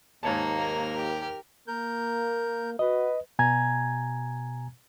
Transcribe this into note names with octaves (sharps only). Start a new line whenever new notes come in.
D#2 G#2 A#3 D#4 C#5 A5
A#4 F6
G4
A#3 A#4 G6
F#4 B4 D#5
B2 G#5 A#5 G#6